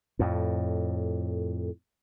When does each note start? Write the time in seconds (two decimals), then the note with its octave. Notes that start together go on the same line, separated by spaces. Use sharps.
0.19 F2 A2